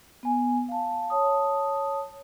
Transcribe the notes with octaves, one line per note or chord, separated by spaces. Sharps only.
B3 G#5
F5 A5
C#5 A5 D#6